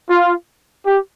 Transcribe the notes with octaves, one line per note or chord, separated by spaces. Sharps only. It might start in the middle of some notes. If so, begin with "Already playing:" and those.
F4
G4